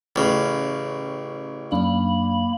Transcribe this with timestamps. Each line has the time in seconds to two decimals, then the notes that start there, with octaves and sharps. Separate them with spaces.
0.16 A1 C#3
1.72 F#2 A#3 D4 B5